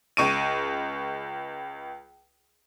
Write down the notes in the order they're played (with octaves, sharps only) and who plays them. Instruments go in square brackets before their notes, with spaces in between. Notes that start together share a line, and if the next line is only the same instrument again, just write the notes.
[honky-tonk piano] C#2 C#6 D7 D#7